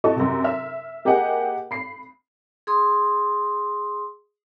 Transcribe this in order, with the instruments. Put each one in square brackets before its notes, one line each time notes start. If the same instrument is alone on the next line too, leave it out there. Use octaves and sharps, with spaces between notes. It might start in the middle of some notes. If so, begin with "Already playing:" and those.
[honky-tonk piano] E4 F#4 A4 D#5 C#6
F#2 C3
E5 F6
A#3 G4 G#4 D#5 F#5
B5 C7
[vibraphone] G#4 C6 D#6